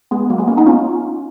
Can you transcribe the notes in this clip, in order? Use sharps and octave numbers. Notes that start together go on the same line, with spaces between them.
G#3 B3
F#3 A#3
G#3 B3
A#3 C#4
B3 D#4
C#4 F4